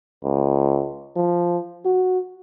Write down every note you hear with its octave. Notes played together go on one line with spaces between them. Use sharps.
C#2
F3
F#4